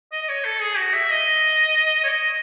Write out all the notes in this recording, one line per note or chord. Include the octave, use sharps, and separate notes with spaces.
D#5
D#5
C#5
A4
G#4
F#4
E5
D#5
C#5
D#5